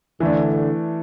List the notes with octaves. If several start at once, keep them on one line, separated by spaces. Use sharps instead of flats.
D3 E3 A3 D4